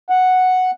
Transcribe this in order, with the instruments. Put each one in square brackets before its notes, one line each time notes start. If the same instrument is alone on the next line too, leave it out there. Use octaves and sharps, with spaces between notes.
[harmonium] F#5